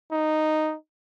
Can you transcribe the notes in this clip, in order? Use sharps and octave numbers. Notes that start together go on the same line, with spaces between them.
D#4